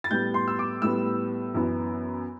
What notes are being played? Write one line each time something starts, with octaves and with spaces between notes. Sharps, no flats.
A6
A2 G3 B3 G6
C6
E6
D6
A2 G3 B3 E6
F#2 E3 B3